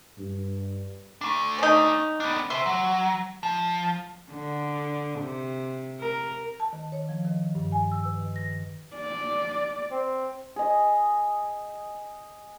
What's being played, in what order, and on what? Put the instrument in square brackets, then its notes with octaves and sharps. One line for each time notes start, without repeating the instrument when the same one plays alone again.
[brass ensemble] G2
[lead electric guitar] A3 D4
[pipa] C#4 D#4
[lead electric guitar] B3 D4
[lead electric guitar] C5 E5 [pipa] C6
[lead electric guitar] F#3
F3
[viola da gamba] D3
C3
A#4
[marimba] A5
D#3
C#5
F3
D#3
G2
G#5
E6
B4
D#3
A#6
[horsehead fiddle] D5
[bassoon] C4
[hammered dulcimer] G#4 D#5